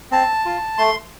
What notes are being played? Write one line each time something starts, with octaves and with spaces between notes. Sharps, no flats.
C4 A5
F4
A3 C6